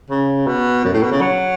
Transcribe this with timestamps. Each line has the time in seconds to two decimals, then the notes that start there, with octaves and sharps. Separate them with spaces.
0.10 C#3
0.47 B2
0.84 F#2
0.93 A2
1.02 B2
1.11 C#3
1.21 F#3